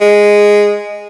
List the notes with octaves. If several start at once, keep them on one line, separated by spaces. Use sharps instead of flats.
G#3